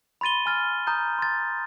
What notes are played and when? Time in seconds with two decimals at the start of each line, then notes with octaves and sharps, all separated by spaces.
0.21 B5 C6 A6 D#7 G7
0.46 G#5 F6 A6
0.87 A#5 D#6 G6
1.19 C6 A6